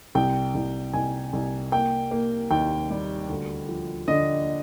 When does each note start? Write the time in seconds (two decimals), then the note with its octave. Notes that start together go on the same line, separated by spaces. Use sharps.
0.15 C2 G5
0.55 C2
0.93 C2 G#5
1.33 C2
1.72 A#3 G5
2.11 A#3
2.51 D#2 G5
2.90 G3
3.29 D2
3.69 F3
4.08 D3 D#5